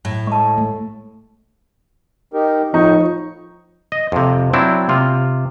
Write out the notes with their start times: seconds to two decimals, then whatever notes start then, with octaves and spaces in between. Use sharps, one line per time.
0.05 A2
0.27 G#3 A5 C#6
0.58 A3
2.33 D#4 G4 A#4
2.74 A2 F3 D#4 C#6
3.92 D#5
4.12 F2 C3
4.53 F#3 C4 D4 E4
4.89 C3 F4